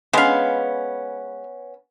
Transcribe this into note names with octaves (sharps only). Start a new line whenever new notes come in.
G#3 B3 C#4 F5